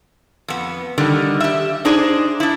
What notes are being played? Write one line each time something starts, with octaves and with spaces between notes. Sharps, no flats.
F2 B3
D3 D#3 G3
G4 E5
D4 D#4 G#4 C5 D5
D4 E4